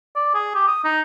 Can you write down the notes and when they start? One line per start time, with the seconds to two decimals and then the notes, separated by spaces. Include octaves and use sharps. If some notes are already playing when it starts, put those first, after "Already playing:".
0.16 D5
0.35 G#4
0.55 G4
0.67 D#6
0.84 D#4